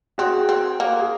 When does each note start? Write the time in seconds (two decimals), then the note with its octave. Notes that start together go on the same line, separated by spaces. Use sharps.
0.18 C4 F#4 G#4
0.49 C4
0.80 A#3
0.99 G#4